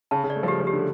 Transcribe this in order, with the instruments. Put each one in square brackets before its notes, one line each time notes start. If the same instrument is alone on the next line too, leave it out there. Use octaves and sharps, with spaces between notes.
[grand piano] C#3 [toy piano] A5
[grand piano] C#3
[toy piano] D5
[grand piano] A3
F3
[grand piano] G3 [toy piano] G4
[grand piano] F3
[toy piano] G4
[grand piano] D3